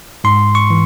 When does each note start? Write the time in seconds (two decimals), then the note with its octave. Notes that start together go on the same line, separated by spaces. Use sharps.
0.24 G#2 C6
0.55 C#6
0.70 E3